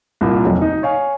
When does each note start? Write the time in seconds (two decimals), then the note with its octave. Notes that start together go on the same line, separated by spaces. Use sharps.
0.21 C2 A#2 A#3
0.45 F1 F#3
0.62 D#4
0.83 C#5 F5 G#5